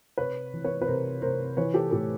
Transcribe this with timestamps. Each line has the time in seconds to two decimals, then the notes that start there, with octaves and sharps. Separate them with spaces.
0.18 C3 B4 C#5
0.53 E3
0.64 B4 C#5
0.82 B4
0.87 C3 A#4 C5
1.22 C3 A#4 C5
1.57 E3 B4 C#5
1.74 G4 A4
1.91 A2 G4 A4